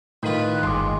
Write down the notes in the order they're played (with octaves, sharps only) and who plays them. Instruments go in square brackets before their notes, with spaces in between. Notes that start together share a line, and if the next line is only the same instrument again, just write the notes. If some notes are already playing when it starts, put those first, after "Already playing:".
[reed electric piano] A2 [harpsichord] D#3 F4 [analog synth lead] B4
[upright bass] G1 [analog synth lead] G#3 [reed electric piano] C6 D6